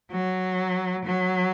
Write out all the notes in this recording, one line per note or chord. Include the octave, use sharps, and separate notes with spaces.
F#3
F#3